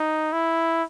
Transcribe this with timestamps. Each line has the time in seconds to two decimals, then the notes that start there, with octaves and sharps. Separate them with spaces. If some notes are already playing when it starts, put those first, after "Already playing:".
Already playing: D#4
0.32 E4